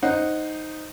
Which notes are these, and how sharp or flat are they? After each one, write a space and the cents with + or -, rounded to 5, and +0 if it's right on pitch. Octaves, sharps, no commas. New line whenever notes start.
D#4 +0 C5 +5 F#5 +0